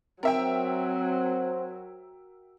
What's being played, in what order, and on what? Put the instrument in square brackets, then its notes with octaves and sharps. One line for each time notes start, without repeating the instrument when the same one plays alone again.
[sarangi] F#3 [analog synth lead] C4 [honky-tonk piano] A#4 E5 G5